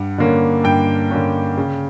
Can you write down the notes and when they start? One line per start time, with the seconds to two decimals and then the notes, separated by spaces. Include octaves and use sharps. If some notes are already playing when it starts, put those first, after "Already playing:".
Already playing: G2 F#5
0.18 D3 A#3 C#4
0.64 G2 G5
1.11 D3 A#3 C#4
1.57 C#3